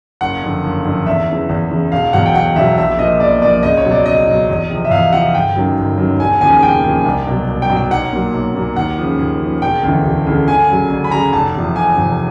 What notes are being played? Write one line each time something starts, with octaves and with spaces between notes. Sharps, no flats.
F#1 F#5
F2 D3
F#1
F2 D3
E2 E5
C#3 E3
E2
C#3 E3
E1 F5
E2 B2 F#3 F#5
G5
E1 F#5
E2 B2 F#3 E5
A#1 E5
A#2 F3 D#5
A#1 D5
A#2 F3 D5
C#2 D#5
C#5
B2 F#3
D5
C#2 D#5
B2 F#3
E2
C3 F3
E5
E2 F5
C3 F3 F#5
G1 G5
F#2 D#3 F#3
G1
F#2 D#3 F#3
E1 G#5
D#2 C#3 F3 G#5
E1 G5
D#2 C#3 F3
C2
B2 F#3
C2
G5
B2 F#3
G5
B1 F#5
A#2 F#3
B1
A#2 F#3
D#2 F#5
C#3 F3
D#2
C#3 F3
E1 G5
D2 C#3 E3
E1
D2 C#3 E3
D2 G#5
C#3 F#3
D2
B5
C#3 F#3 A#5
F1 A5
E2 C3 F3
F1 G#5
E2 C3 F3